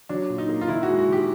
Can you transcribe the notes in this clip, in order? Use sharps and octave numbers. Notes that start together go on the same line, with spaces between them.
F#3 D4
A#2
D#4
A#3
F4
D#3 E4
F#4
G#3
F#4
D#3
G4